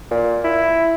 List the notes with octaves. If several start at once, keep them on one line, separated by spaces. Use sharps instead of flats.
A#2
E4